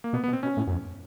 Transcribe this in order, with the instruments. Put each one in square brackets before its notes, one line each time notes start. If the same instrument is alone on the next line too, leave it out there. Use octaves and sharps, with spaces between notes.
[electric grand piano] A#3
[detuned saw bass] B2 [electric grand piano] B3
[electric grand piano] B3
[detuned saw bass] B2
[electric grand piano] C4
[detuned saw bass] B2 [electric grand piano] C#4
[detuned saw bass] A2
F#2
F2